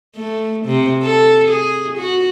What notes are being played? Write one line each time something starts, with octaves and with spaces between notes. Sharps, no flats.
A3
C3
A4
G#4
F#4